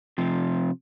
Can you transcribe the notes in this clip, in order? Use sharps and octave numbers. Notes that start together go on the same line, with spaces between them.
C3 F3